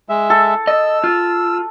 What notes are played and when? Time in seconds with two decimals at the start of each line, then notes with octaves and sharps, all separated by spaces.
0.09 G#3 E5
0.30 A4
0.67 D#5 E6
1.04 F4